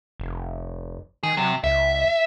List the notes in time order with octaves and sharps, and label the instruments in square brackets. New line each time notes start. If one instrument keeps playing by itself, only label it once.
[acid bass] F1
[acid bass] D#3 [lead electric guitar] G#4
[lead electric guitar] C3 [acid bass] F#3
[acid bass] C#2 [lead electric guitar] E5